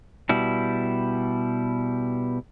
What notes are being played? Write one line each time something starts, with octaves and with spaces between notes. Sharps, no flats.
B2 G3 E4